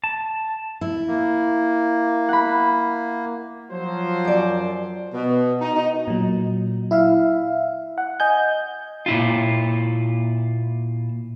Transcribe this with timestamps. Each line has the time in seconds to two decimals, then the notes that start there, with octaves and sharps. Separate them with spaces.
0.04 A5
0.81 E4
1.08 A#3
2.28 F#5 B5
3.71 F3 F#3 C5
4.25 F#2 D5
5.14 B2
5.61 D#4
5.76 D#4
6.08 A#2 F#3
6.91 E4 E5 F5
7.98 F#5
8.20 D#5 G#5 G6
9.06 A#2 E4 F4